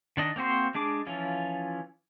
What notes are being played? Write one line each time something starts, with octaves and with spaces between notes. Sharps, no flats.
D#3 D4 D#5
A#3 C4 F#4 C5
G#3 D4 G#4 D6
E3 F3 C#4 F4